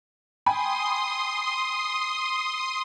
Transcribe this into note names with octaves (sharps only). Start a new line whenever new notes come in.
G5 G#5 B5 C6 D#6